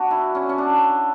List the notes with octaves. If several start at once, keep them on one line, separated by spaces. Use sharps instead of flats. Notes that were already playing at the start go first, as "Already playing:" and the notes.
Already playing: D4 F#4
E4
C#4
C#4
D4